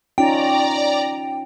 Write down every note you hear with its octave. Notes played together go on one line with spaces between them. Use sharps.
C#4 D#4 F4 D5 G5 A#5